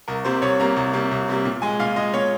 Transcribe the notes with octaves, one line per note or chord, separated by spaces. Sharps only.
C2 A#4
C3 G3 A#3 C5
C2 C#5
C3 G3 A#3 A#5
C2
C3 G3 A#3
C2
C3 G3 A#3
A#2
G#3 G#5
A#2 F5
G#3 D#5
A#2 C#5